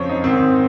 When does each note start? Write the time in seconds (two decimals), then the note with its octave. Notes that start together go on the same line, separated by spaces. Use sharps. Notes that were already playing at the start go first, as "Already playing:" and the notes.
Already playing: F2 C#3 F3 C5 C#5
0.09 D#4
0.24 G#2 D#3 C4